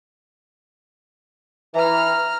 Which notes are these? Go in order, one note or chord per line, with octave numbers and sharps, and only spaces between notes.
E3 A#5 F6